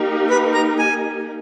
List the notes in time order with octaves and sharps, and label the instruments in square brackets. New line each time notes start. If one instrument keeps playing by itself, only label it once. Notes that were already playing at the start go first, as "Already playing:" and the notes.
Already playing: [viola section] A#3 D#4 G4 A#4
[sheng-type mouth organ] B4
A#5
G#5